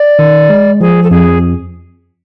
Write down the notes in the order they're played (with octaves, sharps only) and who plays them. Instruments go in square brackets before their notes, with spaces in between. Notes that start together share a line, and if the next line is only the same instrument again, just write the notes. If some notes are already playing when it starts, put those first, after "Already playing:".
Already playing: [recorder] D5
[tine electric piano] D#3
G#3
[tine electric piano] F3 [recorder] G#4
[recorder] A4
[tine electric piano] F2 [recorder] G#4